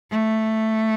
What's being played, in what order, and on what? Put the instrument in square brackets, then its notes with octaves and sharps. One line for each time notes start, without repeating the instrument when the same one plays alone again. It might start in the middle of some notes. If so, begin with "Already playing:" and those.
[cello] A3